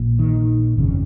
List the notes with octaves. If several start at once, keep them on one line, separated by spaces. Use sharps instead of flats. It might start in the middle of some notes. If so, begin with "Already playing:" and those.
Already playing: A#1 A#2
D#3
G1 F2 C#3